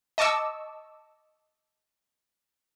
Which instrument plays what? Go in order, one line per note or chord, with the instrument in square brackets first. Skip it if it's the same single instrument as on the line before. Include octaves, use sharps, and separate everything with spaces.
[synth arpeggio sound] D#5 A5 C#6 D6 E6